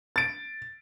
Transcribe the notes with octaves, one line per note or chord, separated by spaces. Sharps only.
A6 D7